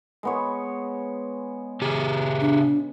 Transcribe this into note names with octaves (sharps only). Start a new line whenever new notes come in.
G#3 B3 C#5
C#3 G4 G#4
D4